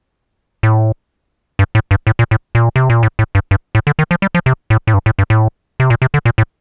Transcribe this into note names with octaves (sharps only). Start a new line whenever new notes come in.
A2
G2
A2
G2
A2
A#2
A2
A#2
C3
A#2
A2
A2
G2
G2
A2
D3
D#3
F3
G3
F3
C3
A2
A2
G2
A2
G2
A2
C3
A#2
C3
D3
A#2
A2